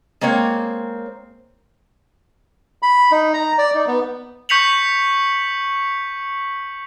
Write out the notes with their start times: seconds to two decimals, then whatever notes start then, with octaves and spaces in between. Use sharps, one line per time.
0.21 G#3 A#3 C4 C#5
2.82 B5
3.12 D#4
3.34 A#5
3.58 D5
3.75 D#4
3.87 B3
4.49 C#6 G6 B6 C#7 F7 F#7